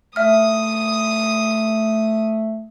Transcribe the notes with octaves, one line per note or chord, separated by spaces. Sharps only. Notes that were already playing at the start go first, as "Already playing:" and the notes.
A3 E5 D#6 F6